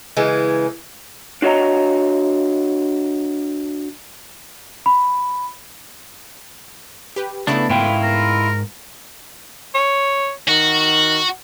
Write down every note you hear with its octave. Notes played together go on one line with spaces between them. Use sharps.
C#3 E3 G#3
D4 F#4 C#5 D#5 A#5
B5
G4 B4
C#3 A3 B3 D4 E4
G#2 E4 F4 G5
A#4
C#5
D#3 F#4